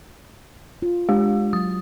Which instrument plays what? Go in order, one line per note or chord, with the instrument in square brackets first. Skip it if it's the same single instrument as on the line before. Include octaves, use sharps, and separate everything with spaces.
[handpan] F4
[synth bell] G#3 G4
[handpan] F#3 [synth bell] D#6